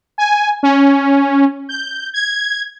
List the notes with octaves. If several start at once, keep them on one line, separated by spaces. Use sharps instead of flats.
G#5
C#4
G6
G#6